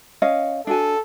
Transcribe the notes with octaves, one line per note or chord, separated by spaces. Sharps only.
C#4 D#5 F5
D4 F#4 A4 G#5